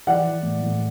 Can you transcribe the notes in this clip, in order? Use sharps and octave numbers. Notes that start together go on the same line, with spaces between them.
E3 D5 F#5
E3
A2
A2